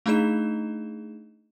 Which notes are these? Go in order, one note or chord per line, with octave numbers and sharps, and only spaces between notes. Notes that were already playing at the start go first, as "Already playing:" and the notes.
A3 D4 D#4 G#4 D#5 E7